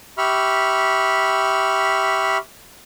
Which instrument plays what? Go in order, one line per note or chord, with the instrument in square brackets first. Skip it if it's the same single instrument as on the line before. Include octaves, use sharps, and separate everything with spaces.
[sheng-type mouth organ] G4 E5 B5 C#6 F6